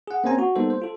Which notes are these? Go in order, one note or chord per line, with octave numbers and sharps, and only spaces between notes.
G#4 F#5
A#3 C4 C#4 C5 G#5 A#5
F#4
G3 A#3 B3 D#4 A4 C5
C5
F4 A4